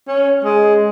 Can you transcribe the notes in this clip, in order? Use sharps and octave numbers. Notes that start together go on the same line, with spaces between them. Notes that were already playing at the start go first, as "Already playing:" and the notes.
C#4
G#3